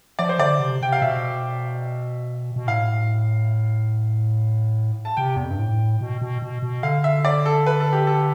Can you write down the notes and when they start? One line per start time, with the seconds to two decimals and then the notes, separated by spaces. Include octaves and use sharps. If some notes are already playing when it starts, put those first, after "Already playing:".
0.19 F3 D5
0.29 C5
0.39 D3 D5
0.60 C3
0.81 C3 G5
0.92 F5
1.02 B2 E5
2.56 B2
2.67 A2 F5
5.05 A5
5.17 C3 G5
5.36 E2
5.44 F2
5.51 G2
5.59 A2
6.01 B2
6.21 B2
6.42 B2
6.63 B2
6.83 D3 F5
7.04 E5
7.25 D5
7.46 A4
7.66 B4
7.80 A4
7.93 G4
8.07 A4